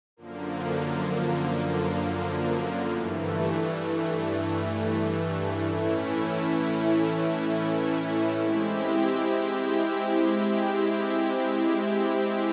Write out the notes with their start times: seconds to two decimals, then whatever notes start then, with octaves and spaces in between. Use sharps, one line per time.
0.17 F#2 D3 F3 A#3
2.90 G2 E3 A3
5.62 A2 E3 A3 C#4 E4
8.36 G#3 C4 E4 G4